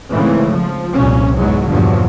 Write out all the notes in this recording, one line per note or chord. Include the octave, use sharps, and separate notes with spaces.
G#2 C#3 E3 A3 A#3 C4
F3
C2 F2 A#2 C#4
E2 G#2 F#3 G#3
E2 G2 A#2 D3 F3 F#3